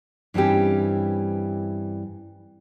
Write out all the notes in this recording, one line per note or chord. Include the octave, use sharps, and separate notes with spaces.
G2 E3 C4 C#4 G4